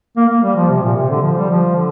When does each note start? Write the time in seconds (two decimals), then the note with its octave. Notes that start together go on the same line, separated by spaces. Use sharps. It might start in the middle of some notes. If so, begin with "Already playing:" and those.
0.17 A#3
0.29 A#3
0.43 G3
0.56 F3
0.70 C3
0.82 A#2
0.96 C3
1.10 D3
1.23 F3
1.37 G3
1.49 F3
1.75 D3